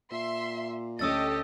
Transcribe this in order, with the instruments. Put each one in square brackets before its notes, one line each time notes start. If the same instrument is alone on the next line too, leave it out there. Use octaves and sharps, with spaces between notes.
[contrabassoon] A#2 [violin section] E5 C6
[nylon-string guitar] D2 C#4 [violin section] G4 A4 D#5 [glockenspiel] D#6 E6 A6